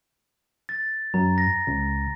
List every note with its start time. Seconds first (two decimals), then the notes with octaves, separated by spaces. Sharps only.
0.69 A6
1.14 F#2 A#5
1.38 A#6
1.67 C#2